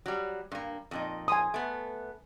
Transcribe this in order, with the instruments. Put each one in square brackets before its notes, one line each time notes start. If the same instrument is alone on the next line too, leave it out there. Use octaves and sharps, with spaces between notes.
[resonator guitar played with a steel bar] F#3 G3
G2 A#3
F2 A#2 D#4
[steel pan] G#5 C6 D#6
[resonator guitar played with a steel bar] A3 B3